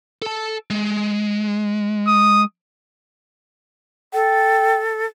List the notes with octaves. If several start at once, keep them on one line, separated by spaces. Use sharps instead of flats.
A4 A5
G#3
D#6
A4 G5